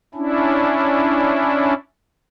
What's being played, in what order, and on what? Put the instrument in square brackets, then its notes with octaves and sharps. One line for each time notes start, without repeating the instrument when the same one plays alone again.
[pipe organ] C#4 D4 E4